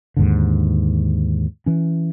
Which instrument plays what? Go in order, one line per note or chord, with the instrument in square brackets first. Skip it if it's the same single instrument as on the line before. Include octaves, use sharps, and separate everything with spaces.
[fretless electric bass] D#2 G#2 D3
E3 C#4